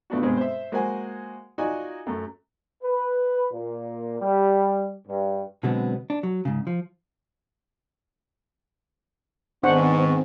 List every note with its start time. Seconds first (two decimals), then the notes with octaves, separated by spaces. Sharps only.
0.10 B2 A3 B3 D4 F4 F#4
0.21 G2 B2 G#3 C4
0.37 C5 E5
0.72 G#3 A#3 F#4 C5 F#5 G#5
1.58 D#4 F4 F#4 D5 D#5 G#5
2.06 F#2 A3
2.83 B4
3.53 A#2
4.20 G3
5.08 G2
5.63 B2 D3 F#3 G#3 B3 C4
6.10 D4
6.23 F#3
6.45 G#2 C#3
6.67 F3
9.63 G#2 D#3 B3 C4 D4 C5 F#5 C#6